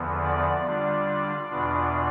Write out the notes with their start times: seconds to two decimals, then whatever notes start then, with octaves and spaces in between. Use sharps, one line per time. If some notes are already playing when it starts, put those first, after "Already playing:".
Already playing: E2 D3 F3 B3
0.23 D5
0.65 D3 G3 D4 F4
1.48 E2 B2 B3 D4 F4